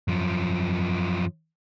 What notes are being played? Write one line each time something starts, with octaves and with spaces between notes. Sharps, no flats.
F#2 F3